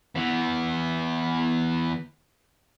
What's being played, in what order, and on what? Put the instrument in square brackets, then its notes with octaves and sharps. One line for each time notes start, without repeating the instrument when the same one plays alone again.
[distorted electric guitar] E3 B3